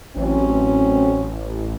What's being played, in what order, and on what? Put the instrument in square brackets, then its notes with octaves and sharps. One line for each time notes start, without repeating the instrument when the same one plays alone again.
[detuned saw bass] A1 [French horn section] F#3 C4 C#4